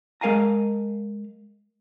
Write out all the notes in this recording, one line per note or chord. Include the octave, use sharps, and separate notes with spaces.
G#3 A#4 F5 G#5 A#5